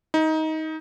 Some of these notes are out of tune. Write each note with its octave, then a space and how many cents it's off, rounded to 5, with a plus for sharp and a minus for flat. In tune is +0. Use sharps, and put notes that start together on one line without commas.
D#4 +20